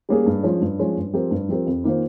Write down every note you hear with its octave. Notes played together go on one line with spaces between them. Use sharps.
G3 A#3 C#4 G#4
G2
F3 G#3 C#4
G2
F3 G#3 C#4
G2
F3 C4 G4 A#4
G2
F3 C4 G4 A#4
F2
D#3 A#3 F4 C5